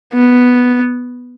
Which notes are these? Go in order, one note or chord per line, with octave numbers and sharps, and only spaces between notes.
B3